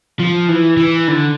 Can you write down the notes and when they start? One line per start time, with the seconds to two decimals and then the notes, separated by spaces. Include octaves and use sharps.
0.20 F3
0.49 E3
0.77 E3
1.08 D3